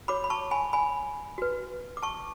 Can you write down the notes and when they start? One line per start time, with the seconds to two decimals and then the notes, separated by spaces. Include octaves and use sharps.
0.08 F#4 C#5 B5 D6
0.24 B5
0.30 A5 C#6
0.51 G#5 B5
0.73 G#5 B5
1.38 F#4 B4
1.97 D6
2.03 A5 C#6